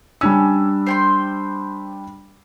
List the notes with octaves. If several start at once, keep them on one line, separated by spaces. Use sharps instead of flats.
G3 C#4 D4 E6
C5 G5 C6